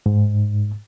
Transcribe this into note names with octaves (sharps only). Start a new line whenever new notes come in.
G#2